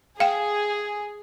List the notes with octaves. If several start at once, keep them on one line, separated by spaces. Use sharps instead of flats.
G#4 F5 G5